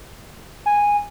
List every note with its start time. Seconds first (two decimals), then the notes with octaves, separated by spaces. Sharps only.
0.66 G#5